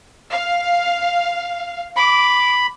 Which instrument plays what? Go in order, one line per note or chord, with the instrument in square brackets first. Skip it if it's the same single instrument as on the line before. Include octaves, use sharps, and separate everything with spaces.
[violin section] F5
[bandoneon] B5 [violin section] D6